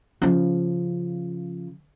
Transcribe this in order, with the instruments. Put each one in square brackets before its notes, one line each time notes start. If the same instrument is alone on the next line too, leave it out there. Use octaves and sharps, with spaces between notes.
[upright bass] C#3 F3